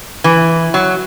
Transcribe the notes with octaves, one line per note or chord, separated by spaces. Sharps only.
E3
F#3